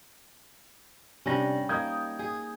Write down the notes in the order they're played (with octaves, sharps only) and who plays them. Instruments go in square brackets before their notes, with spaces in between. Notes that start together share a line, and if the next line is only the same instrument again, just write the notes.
[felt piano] C3 D4 A#6 [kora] G3 C#4
[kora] A#3 D#4 [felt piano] D#6 G6 G#6
[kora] G#4